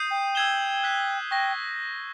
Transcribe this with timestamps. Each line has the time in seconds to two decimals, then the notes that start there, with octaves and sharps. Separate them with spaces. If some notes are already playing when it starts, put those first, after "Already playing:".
Already playing: D#6 G6 C7 D#7
0.11 G5
0.35 E6 G#6 C7 E7 G7
0.83 F#6 B6 E7 G7
1.31 G5 C#6 F#6 A#6